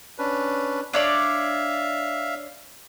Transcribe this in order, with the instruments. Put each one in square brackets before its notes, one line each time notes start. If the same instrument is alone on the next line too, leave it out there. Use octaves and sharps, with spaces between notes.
[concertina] C#4 D4 B4
[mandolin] D4 C#5 D5 [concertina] E5 F5